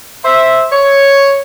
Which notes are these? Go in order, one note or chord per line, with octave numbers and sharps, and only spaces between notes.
C5 E5
C#5